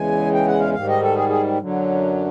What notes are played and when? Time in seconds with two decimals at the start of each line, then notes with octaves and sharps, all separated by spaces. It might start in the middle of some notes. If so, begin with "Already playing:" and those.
Already playing: E2 C#3 E3 G#3 G#5
0.33 G5
0.47 F#5
0.60 F5
0.74 G#2 D#3 G3 F5
0.88 D#5
1.02 A4
1.16 G#4
1.29 G#4
1.58 F#2 D3 F#3